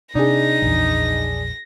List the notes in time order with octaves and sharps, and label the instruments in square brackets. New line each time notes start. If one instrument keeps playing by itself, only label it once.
[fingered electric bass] C3 [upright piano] D4 G#4 [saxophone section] D#4 [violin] A#6
[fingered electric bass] A#1 E2